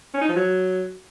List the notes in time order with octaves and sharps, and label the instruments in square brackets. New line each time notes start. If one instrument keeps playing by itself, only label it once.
[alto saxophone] C#4
D#4
F3
F#3